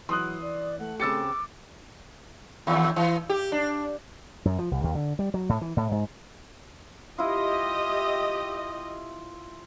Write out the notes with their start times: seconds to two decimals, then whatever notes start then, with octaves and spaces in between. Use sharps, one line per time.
0.09 E3 F#3 C6 D#6 F#6
0.41 D5
0.79 A3 F#5
1.00 C#3 C4 G4 D6 E6 A6 C#7
2.67 D#2
2.96 E3
3.29 G4
3.52 D4
4.45 F#2
4.59 F3
4.71 C2
4.84 D#2
4.95 D3
5.19 G3
5.34 F#3
5.49 A2
5.61 E3
5.77 A2
5.91 G#2
7.18 E4 F4 G4 D#5